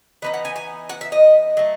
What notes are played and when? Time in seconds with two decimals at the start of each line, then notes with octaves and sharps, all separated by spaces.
0.22 E3 B3 D#4 D#5
0.34 F#5
0.45 G#5
0.56 G#5
0.89 F#5
1.01 E5
1.12 D#5
1.57 F#3 A3